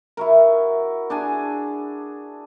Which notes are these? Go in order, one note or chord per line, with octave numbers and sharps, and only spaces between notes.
E4 F#4 A#4
D4 G#4 G#5